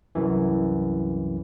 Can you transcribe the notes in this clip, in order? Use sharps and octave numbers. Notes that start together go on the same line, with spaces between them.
C2 F#2 E3